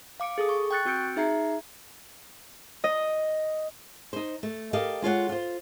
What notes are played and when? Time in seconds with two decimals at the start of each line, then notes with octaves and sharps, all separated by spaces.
0.20 F5 D6 C#7 D7
0.38 G#4 A4 D#6
0.49 C#6
0.71 G5 C#6 F#6 A6 C#7
0.85 C4 F#4 E6 G6 C#7 D7
1.16 D#4 G#4 E5 A#5 G#6 C7
2.84 D#5
4.13 D#4 C5
4.43 A3
4.73 G4 A4 A#4 D#5 F5
5.02 G#3 F4 C#5 F#5
5.29 F4 C5